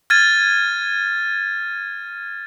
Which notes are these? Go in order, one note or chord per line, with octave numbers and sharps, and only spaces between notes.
F6 G#6 A6 D#7